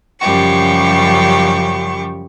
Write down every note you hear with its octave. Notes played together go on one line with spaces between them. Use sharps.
F#2 C#3 F3 G3 G4 C#6